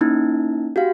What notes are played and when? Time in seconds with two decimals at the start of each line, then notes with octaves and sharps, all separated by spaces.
0.01 A#3 C#4 D#4 E4
0.76 F#4 G4 F5